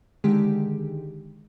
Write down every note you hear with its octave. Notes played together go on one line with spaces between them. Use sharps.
D3 D#3 G#3 G4